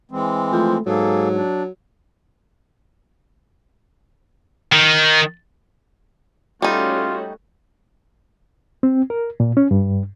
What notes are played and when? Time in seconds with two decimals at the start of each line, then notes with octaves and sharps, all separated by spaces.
0.11 E3 G#3 C4
0.53 F3 A3
0.86 G#2 F#3 A#3 G#4 A4
1.34 D4
4.73 D#3
6.62 G3 A3 C#4 D#4 F4 F#4
8.83 C4
9.10 A#4
9.40 A#2
9.57 C#4
9.71 G2